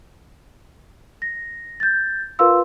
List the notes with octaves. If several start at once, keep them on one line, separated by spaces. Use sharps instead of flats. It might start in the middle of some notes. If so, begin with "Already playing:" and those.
A#6
G6 A6
F4 A#4 B4 F5 C6 E6